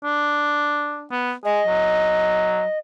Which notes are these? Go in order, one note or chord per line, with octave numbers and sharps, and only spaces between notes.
D4
B3
G#4 D#5
F#3